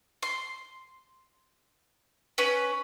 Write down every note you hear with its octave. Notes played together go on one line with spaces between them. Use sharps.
C6
C#4 B4